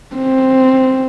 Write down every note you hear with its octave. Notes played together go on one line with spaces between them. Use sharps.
C4